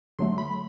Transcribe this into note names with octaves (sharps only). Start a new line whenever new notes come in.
D3 F#3 A3 C6
B5